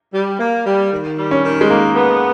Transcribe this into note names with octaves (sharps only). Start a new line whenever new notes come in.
G3
A#3
G3
D#3
G3
C#4
D#3
G#3
A#3 D#4
B3